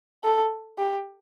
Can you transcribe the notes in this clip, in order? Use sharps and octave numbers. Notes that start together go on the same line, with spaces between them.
A4
G4